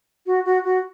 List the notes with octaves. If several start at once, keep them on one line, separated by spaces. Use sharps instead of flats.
F#4
F#4
F#4